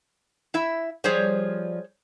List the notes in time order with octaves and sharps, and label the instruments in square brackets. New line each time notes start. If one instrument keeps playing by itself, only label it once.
[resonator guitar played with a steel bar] E4 E5
[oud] F3 G3 [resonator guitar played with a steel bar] G#4 C5 C#5